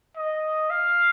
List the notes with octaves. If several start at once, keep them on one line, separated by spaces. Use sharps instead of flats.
D#5
F5